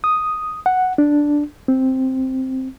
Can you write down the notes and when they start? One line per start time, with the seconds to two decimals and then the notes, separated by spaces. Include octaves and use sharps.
0.04 D#6
0.66 F#5
0.98 D4
1.68 C4